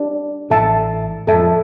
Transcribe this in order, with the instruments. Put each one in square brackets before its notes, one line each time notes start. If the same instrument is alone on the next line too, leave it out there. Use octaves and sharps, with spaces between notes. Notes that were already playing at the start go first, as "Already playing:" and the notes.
Already playing: [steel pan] D4 G4 D5
[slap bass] A1 A2 [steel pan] A4 E5 A5
[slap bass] F2 [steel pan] A4 E5 A5